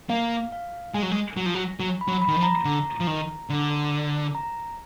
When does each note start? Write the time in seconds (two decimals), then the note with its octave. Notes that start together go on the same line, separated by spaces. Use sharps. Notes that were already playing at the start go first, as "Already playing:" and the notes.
0.10 A#3 F5
0.52 F5
0.94 G#3 G#5
1.02 F#3
1.11 G#3
1.37 F#3
1.46 F3
1.55 F#3
1.80 F#3
2.01 B5
2.08 F#3
2.22 B5
2.28 D#3
2.36 F3
2.43 A#5
2.65 D3
3.00 F3
3.07 D#3
3.50 D3
4.35 A#5